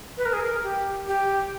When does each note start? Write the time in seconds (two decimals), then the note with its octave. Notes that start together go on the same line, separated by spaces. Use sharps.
0.18 B4
0.25 A#4
0.33 G#4
0.40 A#4
0.63 G4
1.08 G4